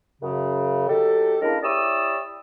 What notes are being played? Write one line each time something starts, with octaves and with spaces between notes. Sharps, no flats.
F#2 C#3
F#3 D#4 G4 A4
C#3 G#3 A#3 D4 E4 A#4
E4 G4 C#5 D5 D#6 E6